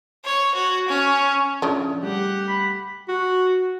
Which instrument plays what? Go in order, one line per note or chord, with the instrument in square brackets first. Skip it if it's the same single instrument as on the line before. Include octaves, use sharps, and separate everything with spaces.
[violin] C#5
F#4
C#4
[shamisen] C#3 D4 [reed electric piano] F3 C#4 E4
[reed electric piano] G3 A3 [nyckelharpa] G4 F#5
[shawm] B5
[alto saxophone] F#4